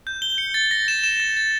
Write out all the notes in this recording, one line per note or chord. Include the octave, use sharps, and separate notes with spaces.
G6
G7
C#7
A6
A#6
E7
E7
A6
A6